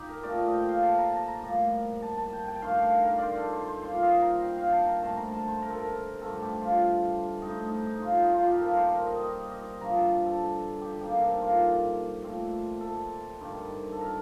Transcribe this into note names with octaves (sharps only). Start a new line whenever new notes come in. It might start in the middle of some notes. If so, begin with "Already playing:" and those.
Already playing: D#4 G4
A#4
A#2 A3 C4 D5
D#5
G5
F5
A5
A#5
A5
A#5
A2 G3 A#3
A5
A5
G5
G5
G2 D#3 A3 F5
F5
A#4
C5 D5
A4
C5
C5
A#2 G3 C4 C5
F5
D#5
A#5
G5
F5
G5 A5
A#5
G2 D3 A3 C4 A5
A#5
A5
C5
A#4
A4
A#4
G2 D3 A3 C4 A4
G4
F4
A2 A3 C4 D#4
D#4
D#4
F4
D#4
F4
G4
A#4
C3 G3 A#3 A4
C5
A#4
D#5
D#5
D#5
G2 D3 F3 A#5
A5
A4
G4
C3 D#3 A#3 G4
A4
F4
A#2 A3 C4
A4
G2 D#3 G3
A4
A#4